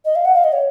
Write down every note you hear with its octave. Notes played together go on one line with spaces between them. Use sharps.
D#5
F5
F#5
F5
D#5
C#5